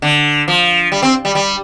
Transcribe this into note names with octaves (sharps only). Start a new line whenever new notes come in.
D3
F3
G3
C4
G3
G3